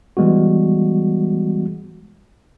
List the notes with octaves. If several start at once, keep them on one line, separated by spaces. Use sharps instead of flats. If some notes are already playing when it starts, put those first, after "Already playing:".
E3 G3 G#3 B3 F#4